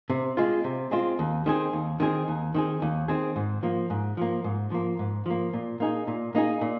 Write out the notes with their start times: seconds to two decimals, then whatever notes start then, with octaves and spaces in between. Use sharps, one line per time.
0.10 C3
0.37 G#3 C4 F4
0.64 C3
0.91 G#3 C4 F4
1.19 D#2
1.46 D#3 C4 G#4
1.73 D#2
2.00 D#3 C4 G#4
2.28 D#2
2.54 D#3 C4 G#4
2.82 D#2
3.08 D#3 C4 G#4
3.36 G#2
3.63 F3 A#3
3.90 G#2
4.17 F3 A#3
4.44 G#2
4.71 F3 A#3
4.99 G#2
5.26 F3 A#3
5.53 A#2
5.80 A#3 D#4 G#4
6.07 A#2
6.35 A#3 D#4 G#4
6.61 A#2